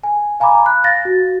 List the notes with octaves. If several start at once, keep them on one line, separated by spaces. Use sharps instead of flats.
G#5
F5 G#5 A#5 B5 D6
F#6
F5 A6 A#6
F#4